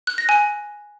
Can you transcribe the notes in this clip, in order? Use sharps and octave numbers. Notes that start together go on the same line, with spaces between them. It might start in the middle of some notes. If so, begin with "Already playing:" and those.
F#6
A#6
G#5